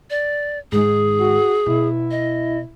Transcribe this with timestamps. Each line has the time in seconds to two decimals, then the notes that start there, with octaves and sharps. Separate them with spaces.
0.10 D5
0.72 G#2 D#3 G#4
1.19 F#4
1.66 B2 E4
2.11 D#5